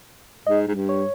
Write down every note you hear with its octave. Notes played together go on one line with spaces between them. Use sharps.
G#2 D#5
G#2
G2
C#5